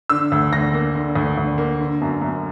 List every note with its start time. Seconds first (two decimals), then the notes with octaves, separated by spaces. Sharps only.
0.10 D3 E6
0.32 D2
0.52 D2 A#6
0.73 A#3
0.95 D3
1.16 D2
1.37 D2
1.58 A#3
1.80 D3
2.01 F#2
2.22 F#2